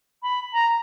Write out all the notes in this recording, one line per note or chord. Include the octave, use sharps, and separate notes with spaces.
B5
A#5